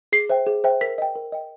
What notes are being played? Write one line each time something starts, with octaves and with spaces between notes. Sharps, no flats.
G#4 C7
C5 E5 G5
G#4
C5 E5 G5
A#4 B6
D#5 G5
A#4
D#5 G5